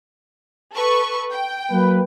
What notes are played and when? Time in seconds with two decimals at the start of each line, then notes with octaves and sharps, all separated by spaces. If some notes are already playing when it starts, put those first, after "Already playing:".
0.72 A4 B4 C#6
1.30 G5
1.72 F#3 A#3 B4